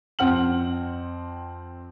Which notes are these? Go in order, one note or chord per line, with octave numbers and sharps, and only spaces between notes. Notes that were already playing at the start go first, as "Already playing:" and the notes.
F2 C4 F#5 F6 F#7